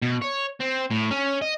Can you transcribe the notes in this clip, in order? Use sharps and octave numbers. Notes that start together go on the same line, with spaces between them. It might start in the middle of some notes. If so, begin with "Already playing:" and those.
B2
C#5
C4
A2
C#4
D#5